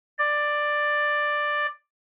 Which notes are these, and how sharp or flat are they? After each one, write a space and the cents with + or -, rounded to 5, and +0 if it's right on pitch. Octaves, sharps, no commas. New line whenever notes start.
D5 +10